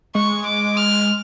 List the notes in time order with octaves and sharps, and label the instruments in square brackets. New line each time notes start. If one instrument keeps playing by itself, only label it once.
[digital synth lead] G#3 [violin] C#6
[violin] D6
F6